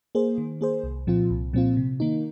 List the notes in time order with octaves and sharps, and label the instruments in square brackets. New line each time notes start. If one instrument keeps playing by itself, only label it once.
[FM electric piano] A#3 G#4 C5
D#3
A#3 G#4 C5
C2
A#2 F3 C4 F4
C2
A#2 F3 C4 F4
C3
D#3 A#3 D#4